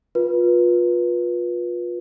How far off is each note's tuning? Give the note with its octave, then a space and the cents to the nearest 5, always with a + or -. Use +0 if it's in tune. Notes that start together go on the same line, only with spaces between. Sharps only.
F4 +25 B4 -25